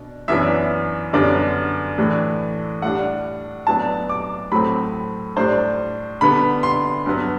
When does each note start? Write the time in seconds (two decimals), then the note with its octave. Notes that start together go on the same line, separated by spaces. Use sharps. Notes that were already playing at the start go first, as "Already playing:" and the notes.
Already playing: B2 D4
0.28 F#2 E3 B3 D4 E5
1.13 F#2 D3 G3 B3 D4 D5
1.98 A2 E3 A3 D4
2.82 A2 G3 D4 F#5
3.67 A2 F#3 B3 D4 A5
4.09 D6
4.52 A2 F#3 A3 C4 B5
5.36 A2 G3 D4 C5
6.21 D3 G3 B3 B5
6.63 C6
7.06 G2 F#3 B3